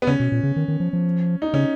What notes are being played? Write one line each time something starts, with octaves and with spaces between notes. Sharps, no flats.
B3
C#3 C#4
B2
A#2
C#3
D#3
D#3
F3
F3
D#4
C#3 C#4